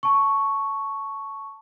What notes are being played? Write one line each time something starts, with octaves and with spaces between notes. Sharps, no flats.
A5 C#6